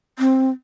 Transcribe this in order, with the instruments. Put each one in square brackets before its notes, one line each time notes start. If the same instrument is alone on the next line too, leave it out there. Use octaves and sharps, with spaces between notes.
[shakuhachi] C4